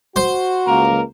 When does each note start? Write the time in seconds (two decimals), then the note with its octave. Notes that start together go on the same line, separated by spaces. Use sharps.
0.16 F#4 C5
0.67 C#2 A#3 A#4